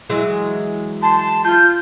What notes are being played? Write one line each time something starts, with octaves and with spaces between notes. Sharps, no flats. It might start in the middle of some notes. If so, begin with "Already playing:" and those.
E3 F#3 G#3
A5 C6
F4 G6